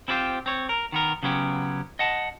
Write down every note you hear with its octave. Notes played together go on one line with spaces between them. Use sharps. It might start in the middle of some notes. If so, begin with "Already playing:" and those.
C4 E4 F4 G4 C5
C4 C#5
A#4
D#3 B3 A#4
C#3 F#3 B3 C#4 G4
D#5 F#5 A5